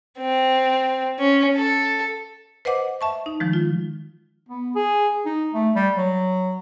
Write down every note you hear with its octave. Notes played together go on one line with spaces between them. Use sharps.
C4
C#4
A4
B4 C5 D#5 F#5 D6
E5 A5 C#6
D#4
D#3 F3 G#3
F4
B3
G#4
D#4
A3
G3
F#3